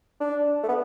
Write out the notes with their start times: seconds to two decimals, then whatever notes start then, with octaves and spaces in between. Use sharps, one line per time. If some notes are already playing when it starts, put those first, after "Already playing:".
0.21 D4
0.64 A3
0.69 B3